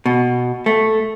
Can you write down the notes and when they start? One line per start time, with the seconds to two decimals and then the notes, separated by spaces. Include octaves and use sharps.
0.06 B2
0.66 A3